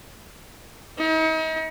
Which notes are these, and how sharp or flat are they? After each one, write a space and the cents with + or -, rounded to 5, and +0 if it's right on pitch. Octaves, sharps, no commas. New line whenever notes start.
D#4 +40